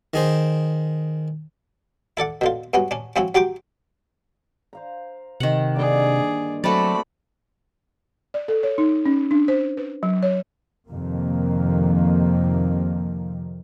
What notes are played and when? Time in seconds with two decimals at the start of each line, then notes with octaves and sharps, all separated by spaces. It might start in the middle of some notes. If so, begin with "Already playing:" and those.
0.14 D#3 G#4 C5
2.17 E4 A4 D5 F#5
2.41 B2 D3 F4
2.74 G2 B3 C#4 F#4
2.91 C#4 D4
3.16 F3 C4 C#4 E4 F#4
3.35 F#3 F#4 G4 G5 C6 D6
4.73 C5 F5 A#5
5.40 C3 D#3 F#5
5.76 G2 D3 A#3 G#4 D5
6.64 F#3 A3 C4 F#4 D5 B5
8.34 D5
8.48 A4
8.63 C#5
8.78 D#4
9.06 C#4
9.31 D4
9.48 C5
9.77 B4
10.03 F#3
10.23 C#5
10.89 F2 C3 D#3 F3 A#3